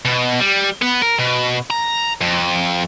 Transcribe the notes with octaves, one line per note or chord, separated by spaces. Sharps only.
B2
G3
B3
A#4
B2
A#5
F2